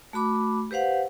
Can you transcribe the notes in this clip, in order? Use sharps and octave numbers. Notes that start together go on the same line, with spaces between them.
A3 F#4 B5 D6
G4 B4 C5 F5 F#5